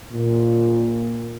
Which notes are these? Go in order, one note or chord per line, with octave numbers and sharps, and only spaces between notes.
A#2